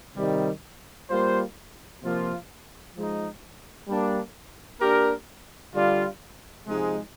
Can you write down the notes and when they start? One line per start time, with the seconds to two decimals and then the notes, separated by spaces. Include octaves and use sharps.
0.16 C3 D#3 G3
1.10 G3 A#3 F4 C5
2.02 C3 F3 A#3 F4
2.95 F3 G#3 D#4
3.88 G3 A#3 D4
4.80 A#3 D4 G4 A#4
5.73 D3 G3 D4 F4
6.66 C3 F3 G#3 D#4